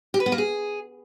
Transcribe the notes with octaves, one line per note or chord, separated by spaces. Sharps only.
G4
B4
B3
A#3
G#4